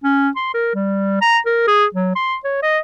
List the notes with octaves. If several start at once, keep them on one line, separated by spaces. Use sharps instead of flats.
C#4
C6
A#4
G3
A#5
A#4
G#4
F#3
C6
C#5
D#5